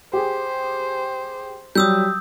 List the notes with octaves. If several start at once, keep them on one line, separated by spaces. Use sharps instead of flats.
G4 G#4 C5
F#3 G3 D#6 E6 G6